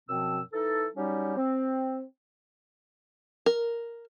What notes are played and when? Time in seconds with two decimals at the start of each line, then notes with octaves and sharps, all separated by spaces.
0.08 F#2 B2 F3 C4 E6
0.53 E3 D#4 A4
0.95 F#3 G3 C#4 D#4 G4
1.37 C4
3.46 A#4